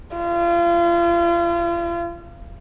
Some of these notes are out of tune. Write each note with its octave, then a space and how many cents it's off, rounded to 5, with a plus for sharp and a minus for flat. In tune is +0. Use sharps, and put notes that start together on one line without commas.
F4 -35